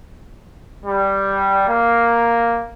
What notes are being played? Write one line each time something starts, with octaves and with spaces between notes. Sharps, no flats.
G3
A#3